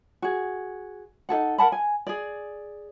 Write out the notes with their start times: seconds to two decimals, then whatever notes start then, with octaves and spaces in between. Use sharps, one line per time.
0.22 F#4 G#4
1.29 D#4 G#4 A4 F#5
1.58 A#4 F#5 A5 B5
1.72 G#5
2.07 G#4 D5